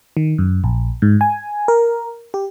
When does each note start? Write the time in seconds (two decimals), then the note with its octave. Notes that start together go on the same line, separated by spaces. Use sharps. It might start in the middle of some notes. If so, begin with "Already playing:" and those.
0.17 D#3
0.38 F#2
0.64 A#1
1.02 G#2
1.21 G#5
1.68 A#4
2.34 G4